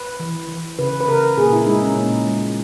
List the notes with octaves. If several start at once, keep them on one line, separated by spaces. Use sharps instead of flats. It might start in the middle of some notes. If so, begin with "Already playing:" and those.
Already playing: B4
E3
E3
C#3 B4
B4
C#3 A#4
A#2 G#4
E4
G#3 D#4
C#4
A#2
G#3